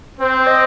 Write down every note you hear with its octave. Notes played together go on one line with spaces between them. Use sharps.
C4 C5
D#5